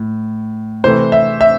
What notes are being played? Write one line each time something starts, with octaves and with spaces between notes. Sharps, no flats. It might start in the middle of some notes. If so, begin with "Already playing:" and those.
Already playing: A2
C3 E3 A3 C5
E5
E5